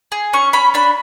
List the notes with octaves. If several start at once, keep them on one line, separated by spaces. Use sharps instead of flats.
G#4
C#4 C#6
C#4 B5
D4 B5